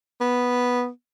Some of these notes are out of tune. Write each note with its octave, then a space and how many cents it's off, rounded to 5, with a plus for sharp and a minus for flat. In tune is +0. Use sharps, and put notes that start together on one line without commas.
B3 -5